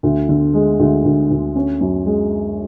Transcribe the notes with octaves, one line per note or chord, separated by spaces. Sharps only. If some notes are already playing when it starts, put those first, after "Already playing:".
D2
D3
G#3
D2
D2
D2
C#4
F#2
G#3